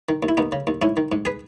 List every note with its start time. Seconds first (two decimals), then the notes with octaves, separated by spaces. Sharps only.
0.09 D#3
0.23 D#2
0.29 E4
0.37 D#2 B3 D#4
0.52 C#3
0.67 D#2
0.82 G#2 C#4 E4
0.97 D#3
1.12 G#2
1.25 G#4 B4